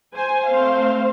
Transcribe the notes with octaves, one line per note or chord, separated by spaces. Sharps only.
C5 G#5
A3 C4 C5 F5